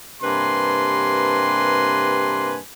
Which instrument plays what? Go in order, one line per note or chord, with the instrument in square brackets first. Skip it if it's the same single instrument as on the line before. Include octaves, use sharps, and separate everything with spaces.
[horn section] G2 C3 A#3 B4 G#5 C6